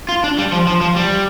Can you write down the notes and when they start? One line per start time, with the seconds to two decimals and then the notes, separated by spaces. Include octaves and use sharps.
0.09 F4
0.24 D4
0.38 G3
0.52 F3
0.67 F3
0.81 F3
0.96 G3